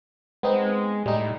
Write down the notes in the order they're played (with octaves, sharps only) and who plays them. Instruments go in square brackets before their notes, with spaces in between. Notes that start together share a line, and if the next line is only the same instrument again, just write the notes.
[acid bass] G#3 [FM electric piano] B3 C4 D#4
[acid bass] A2 [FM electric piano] G3 D#4